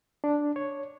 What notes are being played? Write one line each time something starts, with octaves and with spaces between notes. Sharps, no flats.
D4
C#5